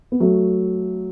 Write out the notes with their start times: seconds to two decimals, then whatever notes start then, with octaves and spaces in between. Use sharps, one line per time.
0.12 B3
0.20 F#3 A3